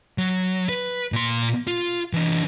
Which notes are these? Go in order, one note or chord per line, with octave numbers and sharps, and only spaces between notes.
F#3
B4
A#2 C6
F4
E3 D4